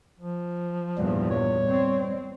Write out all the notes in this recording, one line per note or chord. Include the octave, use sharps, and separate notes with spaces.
F3
E2 G2 A#2 G3
C#5
C4